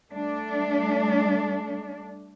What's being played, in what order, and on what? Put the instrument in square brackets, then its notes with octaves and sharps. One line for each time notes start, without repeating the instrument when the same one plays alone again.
[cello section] G3 A3 D4